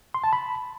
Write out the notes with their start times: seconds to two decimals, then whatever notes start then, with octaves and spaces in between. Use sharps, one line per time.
0.14 C6
0.24 A5
0.33 B5